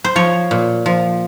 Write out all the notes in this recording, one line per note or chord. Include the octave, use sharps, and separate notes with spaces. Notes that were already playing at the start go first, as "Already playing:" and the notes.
C5
F3 C#5
A#2
F3